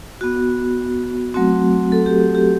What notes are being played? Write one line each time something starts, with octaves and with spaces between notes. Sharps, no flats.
B3 F#4
F#3 A3 C4 F#4
A4
G4
G4
G4